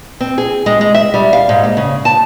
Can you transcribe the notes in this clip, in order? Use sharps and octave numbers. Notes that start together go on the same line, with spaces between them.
C4
G#4
G#3
G#3
E5
G3
F5
G#2
A#3
C#3
A5